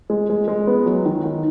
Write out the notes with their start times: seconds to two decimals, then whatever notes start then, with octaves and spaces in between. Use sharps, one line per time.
0.10 G#3
0.30 G#3
0.48 G#3
0.67 B3
0.86 F#3
1.05 D#3
1.24 D#3